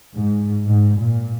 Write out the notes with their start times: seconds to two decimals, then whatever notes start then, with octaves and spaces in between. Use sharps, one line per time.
0.15 G#2
0.68 G#2
0.98 A#2